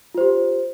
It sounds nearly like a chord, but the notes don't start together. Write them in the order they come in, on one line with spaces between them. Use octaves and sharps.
F4 C5 G4